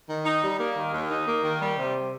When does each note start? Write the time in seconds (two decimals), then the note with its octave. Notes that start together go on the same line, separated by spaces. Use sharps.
0.09 D#3
0.25 D#4
0.43 G3
0.60 A#3
0.76 D#3
0.94 D#2
1.10 D#4
1.28 A#3
1.44 D#3
1.61 G3
1.78 C3